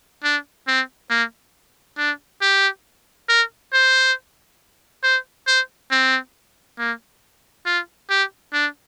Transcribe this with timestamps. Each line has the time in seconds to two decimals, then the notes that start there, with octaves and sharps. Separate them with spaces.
0.24 D4
0.68 C4
1.10 A#3
1.98 D4
2.41 G4
3.29 A#4
3.73 C5
5.03 C5
5.47 C5
5.91 C4
6.79 A#3
7.66 F4
8.10 G4
8.53 D4